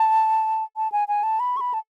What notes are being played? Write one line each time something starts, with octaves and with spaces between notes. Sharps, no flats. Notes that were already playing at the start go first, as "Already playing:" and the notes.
Already playing: A5
A5
G#5
G#5
A5
B5
C#6
B5
A5